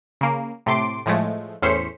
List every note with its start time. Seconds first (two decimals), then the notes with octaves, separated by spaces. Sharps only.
0.21 C#3 A#3
0.66 A2 C3 A3 C6 D6 D7
1.06 A2 F3 G#3 A3
1.62 E2 A2 C#4 C5 B6 C#7